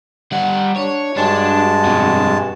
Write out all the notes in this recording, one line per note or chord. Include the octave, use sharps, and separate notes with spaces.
G3 F#5
D4 C#5
G2 G#3 D4 F#4 A5
F2 B2